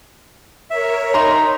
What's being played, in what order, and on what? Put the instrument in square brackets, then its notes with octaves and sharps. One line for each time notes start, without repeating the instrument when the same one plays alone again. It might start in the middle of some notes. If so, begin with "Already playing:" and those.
[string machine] A#4 C#5 [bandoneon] E5
[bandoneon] D#4 [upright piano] A#5 C6